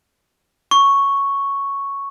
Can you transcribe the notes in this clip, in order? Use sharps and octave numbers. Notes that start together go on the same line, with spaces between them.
C#6